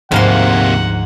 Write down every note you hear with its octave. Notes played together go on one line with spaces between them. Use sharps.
D2 G#2 C3 F3 A#3 F5 F#5 C6